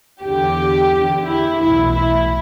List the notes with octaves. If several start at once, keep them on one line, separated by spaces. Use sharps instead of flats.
E2 D3 G4
E2 D3
E4
B1 A2 E3 E4
E4